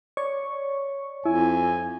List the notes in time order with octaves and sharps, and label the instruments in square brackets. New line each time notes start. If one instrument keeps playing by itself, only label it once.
[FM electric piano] C#5 D5 C#6
[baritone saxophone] F2 [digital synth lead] E4 [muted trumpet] G#5